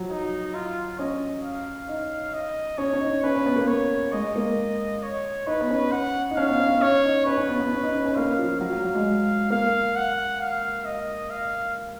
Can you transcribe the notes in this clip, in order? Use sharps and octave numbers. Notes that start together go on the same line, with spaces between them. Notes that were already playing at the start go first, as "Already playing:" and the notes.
Already playing: F3 F#3
D#4
F4
C#4 D#5
F5
D#4
D#5
C#4 C#5
C#4
D#4
C#4 B4
C#4
B3
A#3
C#5
G#3 D#5
G#3
A#3
C#5
D#4 B4
B3
C#4
F#5
D#4
C#4 F5
B3
C#4
B3
C#4 C#5
D#4
C#4 B4
C#4
B3
B3
C#4
D#4
C#4
C#4
A#3 F5
F3
F#3 F5
F#3
F#3
G#3
A#3 F5
F#5
F5
D#5
F5